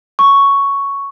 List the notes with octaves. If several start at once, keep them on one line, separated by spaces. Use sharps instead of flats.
C#6